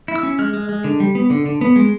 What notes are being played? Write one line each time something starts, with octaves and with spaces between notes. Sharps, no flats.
E4
E6
C#4
G#3 F6
G#3
G#3
D3
G3
B3
D3
D3
B3
G#3